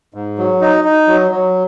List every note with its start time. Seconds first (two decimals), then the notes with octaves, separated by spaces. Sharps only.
0.14 G#2
0.38 F#3
0.61 D#4
0.84 D#4
1.07 F#3
1.31 F#3